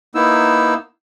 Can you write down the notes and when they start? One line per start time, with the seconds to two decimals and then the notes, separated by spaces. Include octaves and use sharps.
0.15 A#3 B3 D#4 E4 E6